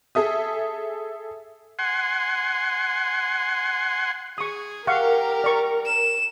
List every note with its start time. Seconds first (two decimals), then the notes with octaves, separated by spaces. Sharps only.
0.15 G#4 A4 E5 D#6
1.79 F#5 G#5 C6
4.38 G#4 C#6 D#6
4.87 G4 A#4 F5 F#5 C#6
5.44 D5 C#6
5.86 E7